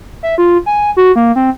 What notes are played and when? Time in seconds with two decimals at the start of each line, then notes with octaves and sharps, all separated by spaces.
0.23 E5
0.38 F4
0.66 G#5
0.97 F#4
1.16 A#3
1.36 C4